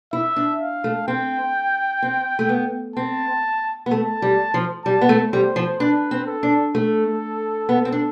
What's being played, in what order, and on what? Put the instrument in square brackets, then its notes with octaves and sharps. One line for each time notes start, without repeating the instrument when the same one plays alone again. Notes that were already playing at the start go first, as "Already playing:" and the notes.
[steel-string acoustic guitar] E4 [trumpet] E5
[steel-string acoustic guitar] D4
[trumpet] F5
[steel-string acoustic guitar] A3
[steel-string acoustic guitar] C4 [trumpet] G5
[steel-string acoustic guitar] C4
A3
B3
[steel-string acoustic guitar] C4 [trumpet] A5
[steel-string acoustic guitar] B3
[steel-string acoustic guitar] A3 [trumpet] A5
[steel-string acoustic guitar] G3
F3
[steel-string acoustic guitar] G3 [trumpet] A5
[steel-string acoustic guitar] B3
A3
[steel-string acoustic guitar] G3 [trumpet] C5
[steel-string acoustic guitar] F3
[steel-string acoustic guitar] D4 [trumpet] B4
[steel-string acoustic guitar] C4
[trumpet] A4
[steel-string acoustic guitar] D4
[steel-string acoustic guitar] A3 [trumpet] A4
[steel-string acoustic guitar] B3
C4
D4